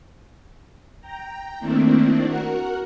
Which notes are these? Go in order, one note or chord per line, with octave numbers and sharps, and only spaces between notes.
G5 A#5
D#3 A3 A#3 C4 D4 E4
F#4 A#4 F#5